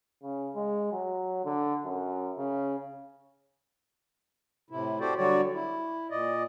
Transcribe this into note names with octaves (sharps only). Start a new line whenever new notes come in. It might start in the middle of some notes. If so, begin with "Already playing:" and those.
C#3
G#3
F#3
D3
F#2
C#3
A2 C3 E4
F#4 G4 A4 C5 D5
D3 F#3 G3 F#4 C#5 D5
E4
A#2 D5 D#5